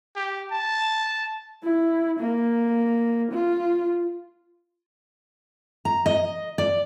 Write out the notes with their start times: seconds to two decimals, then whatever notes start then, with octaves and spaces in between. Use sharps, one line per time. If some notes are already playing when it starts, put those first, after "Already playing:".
0.16 G4
0.52 A5
1.63 E4
2.20 A#3
3.32 F4
5.85 A#5
6.06 D#5
6.58 D5